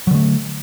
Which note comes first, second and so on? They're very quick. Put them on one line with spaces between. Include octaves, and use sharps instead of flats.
F#3 D3 A3